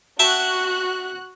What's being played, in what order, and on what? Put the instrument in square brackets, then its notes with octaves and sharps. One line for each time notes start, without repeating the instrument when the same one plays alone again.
[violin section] F#4 F#6 [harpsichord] E5 G5 A5